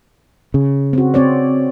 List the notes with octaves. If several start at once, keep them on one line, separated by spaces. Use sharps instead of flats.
C#3
C4 F#4
C4 C#5 D5